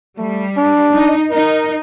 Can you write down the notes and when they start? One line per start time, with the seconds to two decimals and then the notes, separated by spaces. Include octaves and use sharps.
0.17 G3 A3
0.57 D4
0.94 D#4
1.31 D#4 A#4